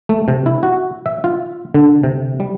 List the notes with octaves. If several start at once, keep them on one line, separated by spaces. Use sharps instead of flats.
A3
C3
E4
F#4
E5
F4
D3
C3
G3